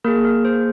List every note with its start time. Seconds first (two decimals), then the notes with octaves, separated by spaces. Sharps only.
0.04 A#3 G#4 A#4
0.25 A#4
0.45 C5